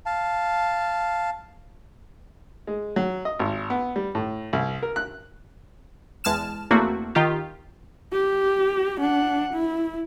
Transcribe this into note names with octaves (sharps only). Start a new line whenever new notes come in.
F5 A5
G#3
F#3
D#5
G#1
B3
G3
A2
C2
A#4
F#6
E2 G#3 A5 F6 E7
E2 A3 A#3 C4 F#4
D#3 F4 G4
G4
D4 F#5
E4